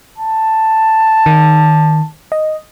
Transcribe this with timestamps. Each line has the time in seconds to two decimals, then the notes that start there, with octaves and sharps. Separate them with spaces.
0.18 A5
1.26 D#3
2.32 D#5